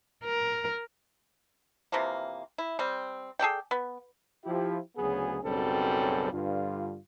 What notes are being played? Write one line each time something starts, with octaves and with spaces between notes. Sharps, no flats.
A#4
C3 E3 F3 A#3
E4
G3 C4
G#4 A4 D5 G5
B3
F3 E4 G4
D2 C#3 F#3 B3 G#4
B1 F#2 C#3 G3 C4 A4
G2 D3 F4